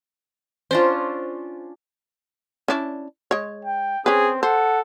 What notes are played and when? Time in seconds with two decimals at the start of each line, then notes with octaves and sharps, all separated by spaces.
0.71 C#4 D4 F4 C5
2.68 C#4 D4 E4
3.31 G#3 C#5
3.65 G5
4.06 C4 C#4 G#4 B4
4.43 A4 C5 F#5